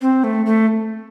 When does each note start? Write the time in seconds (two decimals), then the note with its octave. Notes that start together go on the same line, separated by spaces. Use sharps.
0.01 C4
0.24 A3
0.46 A3